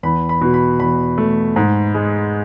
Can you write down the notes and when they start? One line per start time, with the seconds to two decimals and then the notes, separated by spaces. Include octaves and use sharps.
0.03 E2 B5
0.29 B5
0.41 B2
0.54 B5
0.80 E2 B5
1.18 A3
1.56 G#2
1.94 G#3